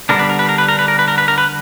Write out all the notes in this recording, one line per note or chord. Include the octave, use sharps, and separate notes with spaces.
D3 G3 B3 D4 A#4
B4
A#4
B4
A#4
B4
A#4
B4
A#4
B4
A#4
B4
A#4
B4